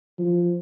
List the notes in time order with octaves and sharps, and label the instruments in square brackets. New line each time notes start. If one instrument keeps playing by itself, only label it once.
[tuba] F3